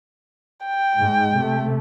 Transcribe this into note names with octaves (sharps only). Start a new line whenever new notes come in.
G5
G#2 G#3
C3 A3